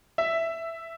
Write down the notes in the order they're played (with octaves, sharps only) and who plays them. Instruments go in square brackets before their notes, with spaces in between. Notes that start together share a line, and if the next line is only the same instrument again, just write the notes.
[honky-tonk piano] E5